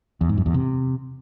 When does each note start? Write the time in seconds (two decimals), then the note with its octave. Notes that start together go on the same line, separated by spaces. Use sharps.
0.21 E2
0.29 G#2
0.38 F#2
0.46 E2
0.54 C3